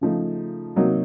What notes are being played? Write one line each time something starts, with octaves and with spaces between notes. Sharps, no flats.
C#3 F3 A3 D#4
C3 F#3 A#3 D#4 F#4